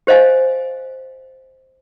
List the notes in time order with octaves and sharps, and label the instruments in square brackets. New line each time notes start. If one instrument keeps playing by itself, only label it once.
[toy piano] G4 C5 D#5 F5 G#5